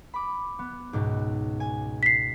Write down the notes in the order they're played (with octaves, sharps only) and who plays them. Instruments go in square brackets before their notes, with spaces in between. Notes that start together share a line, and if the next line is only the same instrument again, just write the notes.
[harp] B5 D6
B3
C#2 G#2 B2
G#5
[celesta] B6 C7